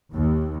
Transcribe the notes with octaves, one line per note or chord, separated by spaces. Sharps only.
D#2